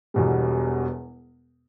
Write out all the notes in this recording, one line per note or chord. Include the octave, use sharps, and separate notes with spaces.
E1 E2 B2 G3